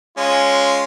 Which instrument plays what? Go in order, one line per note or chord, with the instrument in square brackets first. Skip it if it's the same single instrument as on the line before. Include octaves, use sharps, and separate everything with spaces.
[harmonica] G#3 C#4 F4